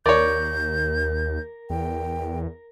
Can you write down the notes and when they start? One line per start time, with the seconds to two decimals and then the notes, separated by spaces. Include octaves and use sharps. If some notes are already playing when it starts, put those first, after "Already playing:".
0.06 D#2 A#4 C#5 D5 G6
1.70 E2 G5